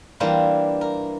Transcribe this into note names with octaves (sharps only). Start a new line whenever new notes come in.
E3 G3 A#3 D4 E4 F4
A#4